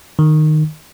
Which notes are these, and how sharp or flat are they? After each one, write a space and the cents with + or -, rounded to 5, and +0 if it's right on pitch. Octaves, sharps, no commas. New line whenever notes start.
D#3 -15